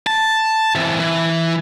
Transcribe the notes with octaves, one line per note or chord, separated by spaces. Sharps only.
A5
E3 C4
E3